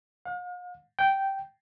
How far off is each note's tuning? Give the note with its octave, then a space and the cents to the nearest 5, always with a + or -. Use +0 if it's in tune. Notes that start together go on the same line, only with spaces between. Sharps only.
F5 +45
G5 -10